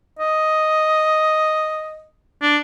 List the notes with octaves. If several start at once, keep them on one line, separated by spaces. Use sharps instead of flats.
D#5
D4